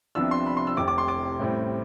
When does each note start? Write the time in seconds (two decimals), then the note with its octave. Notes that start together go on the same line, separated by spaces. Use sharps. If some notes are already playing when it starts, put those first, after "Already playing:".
0.15 C2 C3 F3 B3 D4 E6
0.31 C6
0.46 B5
0.57 C6
0.67 E6
0.77 F1 F2 C3 D6
0.88 D6
0.98 C6
1.08 D6
1.39 A1 A2 G3 C4